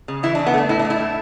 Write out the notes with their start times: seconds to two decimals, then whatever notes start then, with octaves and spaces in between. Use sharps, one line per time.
0.08 C#3
0.23 E3 E4
0.35 C#3 D4
0.46 B3
0.54 A3 D4
0.69 A2 E4
0.79 D4
0.85 A3
0.90 E4
1.00 A2